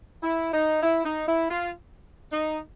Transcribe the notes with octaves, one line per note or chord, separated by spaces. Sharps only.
E4
D#4
E4
D#4
E4
F4
D#4